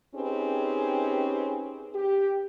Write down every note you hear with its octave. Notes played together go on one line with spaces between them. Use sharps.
C4 C#4 D#4 G4 G#4 B4
G4